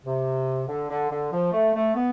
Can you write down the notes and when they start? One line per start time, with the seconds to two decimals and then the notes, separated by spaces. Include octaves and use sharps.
0.05 C3
0.67 D3
0.89 D3
1.10 D3
1.31 F3
1.52 A3
1.75 A3
1.95 B3